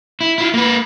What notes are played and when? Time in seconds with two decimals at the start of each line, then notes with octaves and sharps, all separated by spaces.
0.21 E4
0.38 E4 F4
0.54 A#3 B4